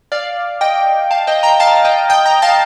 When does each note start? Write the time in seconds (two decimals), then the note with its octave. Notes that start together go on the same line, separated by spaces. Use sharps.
0.12 D5 F5
0.61 D#5 G5
1.11 F5 A5
1.27 D#5 G5
1.43 G5 A#5
1.60 F5 A5
1.85 D#5 G5
2.10 D#5 G5
2.25 G5 A#5
2.42 F5 A5